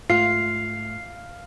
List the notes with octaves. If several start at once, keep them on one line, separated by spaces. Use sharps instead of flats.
G#2 A3 F4 F5 C7